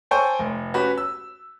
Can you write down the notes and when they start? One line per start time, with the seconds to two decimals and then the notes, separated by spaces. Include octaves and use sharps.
0.11 A4 C5 C#5 G5 G#5 C#6
0.39 F1
0.74 C#4 F#4 G4 B4
0.98 E6